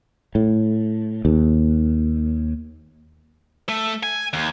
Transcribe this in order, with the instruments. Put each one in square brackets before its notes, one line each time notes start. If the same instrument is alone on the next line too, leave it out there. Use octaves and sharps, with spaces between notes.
[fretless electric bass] A2
D#2
[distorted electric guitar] A3
G#5
D#2